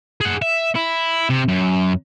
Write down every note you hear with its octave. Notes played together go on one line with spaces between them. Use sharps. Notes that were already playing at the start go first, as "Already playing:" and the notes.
G#4 F#5
E5
E4
C3
F#2